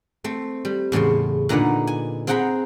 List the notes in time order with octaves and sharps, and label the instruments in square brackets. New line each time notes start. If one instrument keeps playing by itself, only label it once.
[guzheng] A3 C4
G3
E2 A2 C#3 C#5 C6
A#2 D3 D#4 B4 F#5
G#5
C4 G#4 F#5 G5 A#5 B5